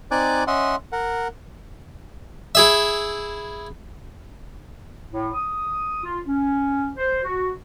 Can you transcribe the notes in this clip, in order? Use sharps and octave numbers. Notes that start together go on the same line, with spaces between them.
C4 D#4 D5 G#5 D6 F#6
C#4 D#5 E5 F#5 C6
A#4 F#5
E4 G#4 E5
A2
D#6
F4
C#4
C5
F#4